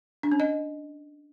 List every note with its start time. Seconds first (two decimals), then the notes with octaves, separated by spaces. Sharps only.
0.23 D4
0.32 C#4
0.40 D#5